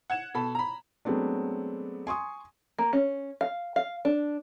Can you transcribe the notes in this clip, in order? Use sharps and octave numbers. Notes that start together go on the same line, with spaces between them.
F#5 G#6 E7
B2 A4 B5
A#5 B5
F#3 G#3 A3 B3 C4 D4
G#5 C6 C#6 D#6
A#3
C#4
F5
F5
D4